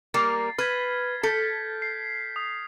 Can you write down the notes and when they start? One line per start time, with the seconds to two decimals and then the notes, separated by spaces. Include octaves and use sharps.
0.14 G3 A#3 A#4 A6 C7
0.58 B4 F6 G#6 B6
1.23 A4 G6 B6 D7
1.82 C7
2.36 D#6